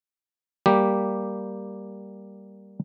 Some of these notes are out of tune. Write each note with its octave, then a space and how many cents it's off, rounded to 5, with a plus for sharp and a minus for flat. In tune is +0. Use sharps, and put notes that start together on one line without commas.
G3 +0 A#3 +0 G4 +0